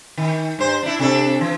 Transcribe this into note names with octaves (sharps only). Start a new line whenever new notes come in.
D#3
G2 C5
D4 E4
C3 D4 A4
E3